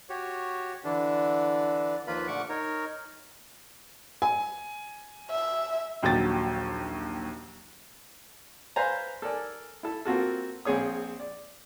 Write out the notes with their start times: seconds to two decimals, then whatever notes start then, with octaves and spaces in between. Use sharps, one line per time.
0.09 F#4 G4 C#5
0.84 D3 E3 D4
2.07 D#2 F3 A#3 F4 B4 B5
2.27 A#2 D3 A3 F#5 C#6 D6
2.49 D#4 A#4 C#5
4.22 G#5
5.31 E5
6.02 A#1 D#2 F#3 G5 A6
8.76 B4 C5 F5 G#5 A#5
9.22 A4 A#4 D5 G#5
9.83 E4 A4
10.05 A#3 C4 F4 F#4 A4
10.65 A#1 C4 G#4 C#5 D#6
11.20 D5